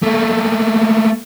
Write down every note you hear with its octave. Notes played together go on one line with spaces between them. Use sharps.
A3 A#3